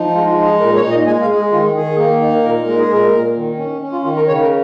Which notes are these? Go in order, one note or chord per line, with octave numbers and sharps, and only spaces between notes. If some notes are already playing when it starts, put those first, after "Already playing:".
Already playing: F3 D#4
G#3 F4
F4
D#4
G#4
A#2 A#4
C#5
A#2
D#5
G#3 G#5
F5
G#3
G#4
D#3 F4
D#3 G#4
A#3
D#4
A#2 A#4
G#3 A#4
G#4
A#2 A#4
A#2
D#3
C#4
C#4
F4
D#3 F4
A#4
C#3 C#5
A#4